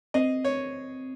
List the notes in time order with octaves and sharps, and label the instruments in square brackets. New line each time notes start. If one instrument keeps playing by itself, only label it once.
[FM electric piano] C4 [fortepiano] D#5
[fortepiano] C#5